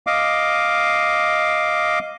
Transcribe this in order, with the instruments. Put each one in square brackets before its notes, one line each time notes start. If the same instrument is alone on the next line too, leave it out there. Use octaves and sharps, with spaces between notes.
[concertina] D#5 F5 D6